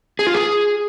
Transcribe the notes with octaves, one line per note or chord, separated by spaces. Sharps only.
G#4
F4
G#4